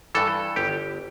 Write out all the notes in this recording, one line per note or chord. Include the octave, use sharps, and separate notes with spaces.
G2 E3 A4
G1 G4